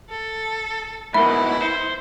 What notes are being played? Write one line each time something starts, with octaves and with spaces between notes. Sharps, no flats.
A4
G#2 B2 E4 A#4 E5 B5
C5